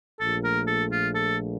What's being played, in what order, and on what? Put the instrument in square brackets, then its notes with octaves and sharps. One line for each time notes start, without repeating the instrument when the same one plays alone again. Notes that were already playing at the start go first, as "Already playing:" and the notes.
[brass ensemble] A#1 A#2 A3 [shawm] A4
[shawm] A#4
A4
F4
A4